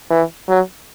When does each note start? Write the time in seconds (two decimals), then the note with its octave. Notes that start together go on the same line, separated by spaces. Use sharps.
0.10 E3
0.48 F#3